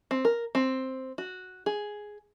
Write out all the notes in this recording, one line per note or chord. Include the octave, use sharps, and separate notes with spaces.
C4
A#4
C4
F#4
G#4